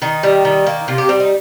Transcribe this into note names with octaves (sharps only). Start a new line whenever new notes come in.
D#3 D#4
G3
D#3
A#3
C3 F4
G4
G3 C4
D#4